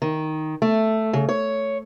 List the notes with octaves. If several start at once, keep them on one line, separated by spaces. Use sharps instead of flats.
D#3
A3
C#3
C#5